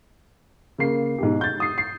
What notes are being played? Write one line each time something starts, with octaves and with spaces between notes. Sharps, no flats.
C#3 A#3 C7
G#2 B2 G4
G6 A6
D#6 C7
C7